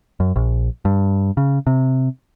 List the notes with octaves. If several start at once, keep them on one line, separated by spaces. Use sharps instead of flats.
F#2
A#1
G2
C#3
C3